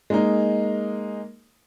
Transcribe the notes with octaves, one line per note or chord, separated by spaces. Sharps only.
G#3 A#3 D#4